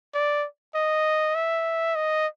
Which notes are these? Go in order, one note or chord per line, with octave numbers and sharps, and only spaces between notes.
D5
D#5
E5
D#5